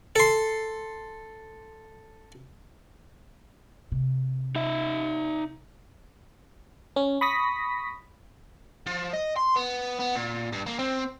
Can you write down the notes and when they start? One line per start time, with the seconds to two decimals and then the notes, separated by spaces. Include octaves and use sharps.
0.16 A4 C6
3.92 C3
4.56 D#4 E5
6.96 C#4
7.21 B5 C#6 D#6 A#6 B6
8.87 F3
9.13 D#5
9.36 C6
9.56 B3
9.99 B3
10.16 A#2
10.53 G2
10.66 A#3
10.79 C4